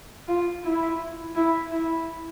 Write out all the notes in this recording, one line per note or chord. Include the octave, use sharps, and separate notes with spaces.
F4
E4
E4
E4